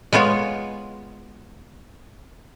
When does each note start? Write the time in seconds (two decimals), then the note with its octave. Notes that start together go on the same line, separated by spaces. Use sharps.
0.13 G#3 B3 F4 C#5